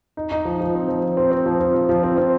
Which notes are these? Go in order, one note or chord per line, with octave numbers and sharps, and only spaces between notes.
D#4
D#4
F3
F3
C4
F3
F3
C4
C4
F3
C4
F3
F3
C4
C4